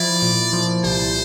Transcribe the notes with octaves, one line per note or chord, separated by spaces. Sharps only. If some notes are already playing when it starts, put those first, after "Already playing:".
Already playing: F3 E4 D5
A#2
F3
C2 C5